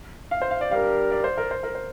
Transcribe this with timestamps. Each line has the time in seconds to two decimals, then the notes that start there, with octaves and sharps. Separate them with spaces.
0.31 F5
0.42 C5
0.51 F5
0.61 D5
0.71 G3 D4 G4 A#4 F5
1.11 D5
1.24 C5
1.38 A#4
1.51 C5
1.63 A#4
1.75 C5